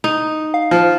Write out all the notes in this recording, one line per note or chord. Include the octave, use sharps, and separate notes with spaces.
D#4
F5
F3